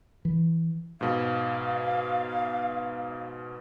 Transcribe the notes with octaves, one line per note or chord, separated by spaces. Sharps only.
E3
G#2 B2 F5